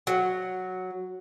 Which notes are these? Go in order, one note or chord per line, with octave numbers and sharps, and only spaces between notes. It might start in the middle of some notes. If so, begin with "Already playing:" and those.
F#3